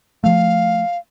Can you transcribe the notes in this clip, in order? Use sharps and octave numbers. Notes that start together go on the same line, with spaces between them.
F3 A3 F5